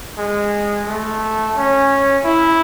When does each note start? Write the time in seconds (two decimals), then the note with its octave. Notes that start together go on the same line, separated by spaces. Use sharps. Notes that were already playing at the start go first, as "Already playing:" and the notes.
0.18 G#3
0.87 A3
1.56 C#4
2.25 E4